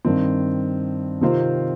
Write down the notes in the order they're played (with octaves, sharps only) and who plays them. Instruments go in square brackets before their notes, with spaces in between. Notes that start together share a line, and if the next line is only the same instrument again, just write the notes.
[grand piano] G2 D#3 C4
C3 D#3 C4 F4 C5